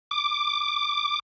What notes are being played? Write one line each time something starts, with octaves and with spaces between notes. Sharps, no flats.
D6